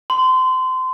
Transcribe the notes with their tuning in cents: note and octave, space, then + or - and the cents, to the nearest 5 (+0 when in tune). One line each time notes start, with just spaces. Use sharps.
C6 -25